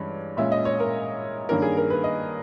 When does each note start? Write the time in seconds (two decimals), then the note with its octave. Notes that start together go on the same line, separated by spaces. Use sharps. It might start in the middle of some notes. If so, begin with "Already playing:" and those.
Already playing: G2 E3 G#3 C#4
0.37 A#2 G#3 C#4 E5
0.52 D#5
0.65 C#5
0.80 A#4
1.49 G2 D#3 A#3 C#4 A#4
1.62 G#4
1.77 A#4
1.90 B4
2.04 D#5